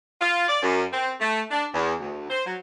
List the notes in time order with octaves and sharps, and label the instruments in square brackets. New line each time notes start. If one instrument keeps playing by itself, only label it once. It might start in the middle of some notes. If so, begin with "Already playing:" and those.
[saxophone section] F4
D5
F#2
C4
A3
D4
E2
D2
C5
F#3